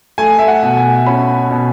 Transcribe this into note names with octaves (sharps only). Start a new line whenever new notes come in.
A3 G#5
E5
F#5
B2
G#5
C#4 B5
B2